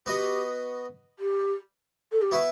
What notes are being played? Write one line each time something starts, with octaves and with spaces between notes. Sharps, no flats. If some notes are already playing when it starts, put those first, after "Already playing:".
B3 F#4 G4 B4 D#5
G4
A4
G4
B3 E4 F#4 B4 E5